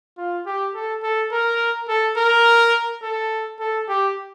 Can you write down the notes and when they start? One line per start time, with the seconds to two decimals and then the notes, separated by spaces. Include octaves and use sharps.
0.18 F4
0.46 G4
0.75 A4
1.03 A4
1.32 A#4
1.88 A4
2.17 A#4
3.02 A4
3.60 A4
3.88 G4